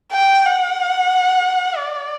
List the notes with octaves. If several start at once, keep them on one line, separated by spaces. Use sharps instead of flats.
G5
F#5
D5